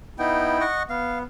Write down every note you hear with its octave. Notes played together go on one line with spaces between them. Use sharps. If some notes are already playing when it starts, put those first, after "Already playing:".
B3 D#4 E4 G5
D#5 F#5 C#6
B3 F5